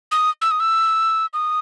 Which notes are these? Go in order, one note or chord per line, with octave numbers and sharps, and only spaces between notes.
D#6
E6
D#6
E6
D#6